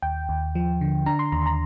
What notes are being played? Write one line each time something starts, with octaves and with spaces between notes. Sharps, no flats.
D#2 G5
D#2
F3
D3
D4 A#5
C6
D#2 A#5
A#5